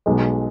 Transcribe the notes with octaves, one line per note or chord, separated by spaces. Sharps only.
B1 B2 G#3